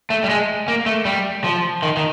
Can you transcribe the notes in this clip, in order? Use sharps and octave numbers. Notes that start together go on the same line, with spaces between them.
A3
G3
G#3
A#3
A3
G3
F3
D#3
D#3